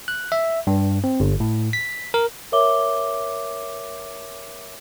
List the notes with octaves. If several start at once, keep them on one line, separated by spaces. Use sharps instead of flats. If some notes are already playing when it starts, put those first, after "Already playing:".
F#6
E5
G2
C4
G1
A2
B6
A#4
A#4 C#5 E5 D6 G7